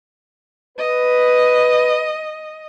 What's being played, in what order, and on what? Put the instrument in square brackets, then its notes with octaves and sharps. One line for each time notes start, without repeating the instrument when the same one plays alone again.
[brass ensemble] B4 [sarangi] D#5